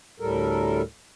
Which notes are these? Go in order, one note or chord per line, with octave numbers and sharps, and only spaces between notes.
D2 A2 G3 A4 A#4